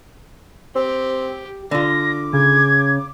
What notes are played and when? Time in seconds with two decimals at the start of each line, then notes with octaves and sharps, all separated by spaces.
0.75 C4 G4
1.71 D3 F4 D6 A#6
2.33 C#3 G#6